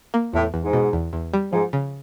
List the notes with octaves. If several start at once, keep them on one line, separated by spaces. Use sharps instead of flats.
A#3
E2 A2
E2
G#2
B2
E2
E2
G3
G#2 F3
C#3